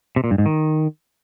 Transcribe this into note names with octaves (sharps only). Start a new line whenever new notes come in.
C3
A#2
G2
G#2
D#3